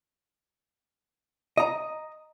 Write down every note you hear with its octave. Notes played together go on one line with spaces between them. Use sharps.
D#5 A#5